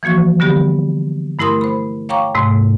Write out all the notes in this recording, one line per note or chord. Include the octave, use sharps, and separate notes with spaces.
E3 F3 A#3 F#4 C#6
D3 G3 B3 G4
G2 A3 E4 A#4 C6 D#6
C5 B5
C#5 F5 G5 A#5 C#6 D6
G#2 C3 A3